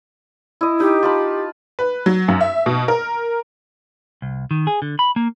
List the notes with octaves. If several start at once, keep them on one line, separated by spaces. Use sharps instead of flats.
E4 D#5
D#4 G4
F4 A5 B5
B4
F#3
F#2
E5
B2
A#4
C2
D#3
G#4
D3
B5
A#3